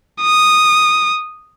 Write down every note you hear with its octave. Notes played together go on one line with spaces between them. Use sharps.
D#6